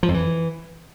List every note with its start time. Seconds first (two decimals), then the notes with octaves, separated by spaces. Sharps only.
0.03 F3
0.09 F2
0.14 E3